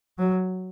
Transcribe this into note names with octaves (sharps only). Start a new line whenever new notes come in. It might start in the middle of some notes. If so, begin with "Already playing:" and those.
F#3